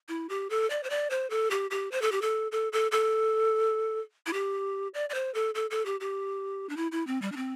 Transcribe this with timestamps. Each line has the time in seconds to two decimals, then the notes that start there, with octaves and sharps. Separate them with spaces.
0.09 E4
0.29 G4
0.50 A4
0.70 D5
0.83 C5
0.90 D5
1.10 C5
1.30 A4
1.51 G4
1.71 G4
1.92 C5
2.02 A4
2.12 G4
2.22 A4
2.52 A4
2.73 A4
2.92 A4
4.26 E4
4.33 G4
4.94 D5
5.10 D5
5.14 C5
5.34 A4
5.55 A4
5.71 A4
5.86 G4
6.00 G4
6.69 D4
6.77 E4
6.92 E4
7.07 C4
7.22 G3
7.32 D4
7.36 C4